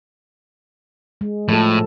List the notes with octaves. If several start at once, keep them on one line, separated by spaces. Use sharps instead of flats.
G#3
A2 F3 A4